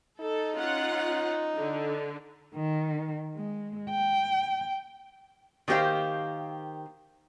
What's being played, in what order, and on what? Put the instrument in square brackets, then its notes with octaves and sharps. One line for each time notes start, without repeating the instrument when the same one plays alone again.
[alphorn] D#4 [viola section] A4
[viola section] C#4 F4 F#5
D3
[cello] D#3
G#3
G5
[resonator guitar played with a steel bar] D#3 A#3 G4 C5 F5